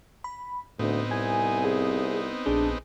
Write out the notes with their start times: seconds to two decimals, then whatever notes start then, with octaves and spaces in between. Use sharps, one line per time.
0.24 B5
0.79 D2 A2 B3 C4 D#4
1.11 C2 G#5
1.65 G#4
2.46 A#1 D4 G#4